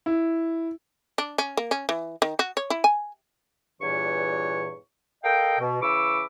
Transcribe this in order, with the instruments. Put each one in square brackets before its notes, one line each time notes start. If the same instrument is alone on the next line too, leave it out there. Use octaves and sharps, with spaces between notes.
[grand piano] E4
[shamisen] D4
C#4
A#3
C#4
E3
D#3
F#4
C#5
E4
G#5
[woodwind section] E2 G2 A#2 E3 C#5 C#6
A4 A#4 D#5 F5 G5
B2
C#3 E3 B5 C#6 D6 E6